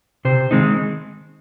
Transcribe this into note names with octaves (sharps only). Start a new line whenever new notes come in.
C3 C5
D#3 G#3 C4 D#4